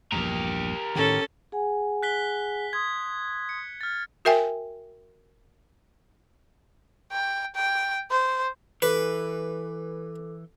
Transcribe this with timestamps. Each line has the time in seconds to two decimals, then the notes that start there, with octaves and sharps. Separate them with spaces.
0.12 A#1 E2 G2 G4 A#4
0.95 A2 D#3 C#4 A4
1.52 G#4 F#5 G#5
2.03 F#6 B6 G7
2.73 C6 D#6 G#6
3.49 C#7
3.81 F6 A6
4.25 F#4 A#4 E5 G5 G#5
7.12 G5
7.55 G5
8.11 C5
8.82 E3 A4 B4 D6